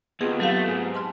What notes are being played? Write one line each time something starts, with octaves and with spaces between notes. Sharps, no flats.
D#2 B3 C4 F4 G#4
F#3 A3 G4 F5
G#2
A5 C6 F6